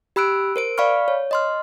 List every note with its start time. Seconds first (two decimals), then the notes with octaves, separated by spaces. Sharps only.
0.16 G4 B5 E6 F#6 D7
0.56 A#4 C5 D7
0.78 D5 F5 B5 C#6 F6
1.08 C#5
1.31 D#5 C6 F6